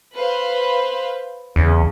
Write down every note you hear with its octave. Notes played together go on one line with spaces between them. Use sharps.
B4 C5 F5
E2 C#3 E3